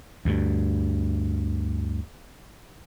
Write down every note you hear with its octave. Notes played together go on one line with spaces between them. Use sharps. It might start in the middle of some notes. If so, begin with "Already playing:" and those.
D2 G2